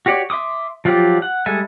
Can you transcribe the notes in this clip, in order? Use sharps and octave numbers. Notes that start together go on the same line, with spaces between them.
F#4 G4 C#5 D5
E5 C6 D6 D#6
F3 F#3 F4 G4 D5
F#5
G3 G#3 A4 E5 G#5